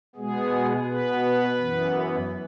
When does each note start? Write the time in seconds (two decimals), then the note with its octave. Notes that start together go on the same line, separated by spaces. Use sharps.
0.15 B2 G#3 B3 G#4
0.86 B2 B3 B4
1.59 F#2 E3 B3